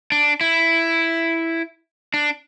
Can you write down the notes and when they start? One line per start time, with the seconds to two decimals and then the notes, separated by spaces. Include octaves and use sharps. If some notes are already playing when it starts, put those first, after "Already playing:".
0.12 D4
0.41 E4
2.14 D4